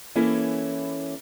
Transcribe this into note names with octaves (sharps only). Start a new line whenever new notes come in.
E3 A#3 C#4 E4 A4